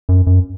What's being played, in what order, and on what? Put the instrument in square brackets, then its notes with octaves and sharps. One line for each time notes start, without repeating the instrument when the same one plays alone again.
[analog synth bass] F#2
F#2